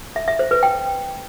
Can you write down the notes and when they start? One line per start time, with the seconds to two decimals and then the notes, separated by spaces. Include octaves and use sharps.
0.16 E5
0.28 E5
0.39 C5
0.51 B4
0.63 G5